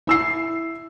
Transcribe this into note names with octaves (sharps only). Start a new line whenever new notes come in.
E4 E6 C7